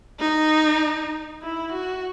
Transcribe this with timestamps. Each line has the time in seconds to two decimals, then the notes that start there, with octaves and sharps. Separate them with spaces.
0.20 D#4
1.42 E4
1.73 F#4